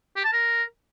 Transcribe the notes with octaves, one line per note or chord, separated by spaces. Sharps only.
G4
A5
A#4